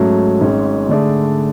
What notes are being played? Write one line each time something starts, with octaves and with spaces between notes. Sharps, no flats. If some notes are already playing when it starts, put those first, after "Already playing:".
Already playing: G#2 F#3 A3 C#4
G#1 G#2 G#3 C#4
D3 A3 D4 G#4 D5